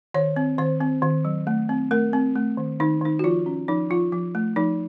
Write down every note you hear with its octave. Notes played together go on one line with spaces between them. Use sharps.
D#3 C#5
C4
D#3 C5
C4
D#3
F#3
A3
C4
A3 A#4
C4
A3
D#3
D#3 D#4
D#3 D#4
F#4
F3 F4
C#4
F3 D#4
F3 F4
F3
A3
F3 D#4